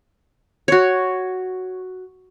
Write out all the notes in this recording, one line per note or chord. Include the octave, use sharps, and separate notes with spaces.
F#4 C#5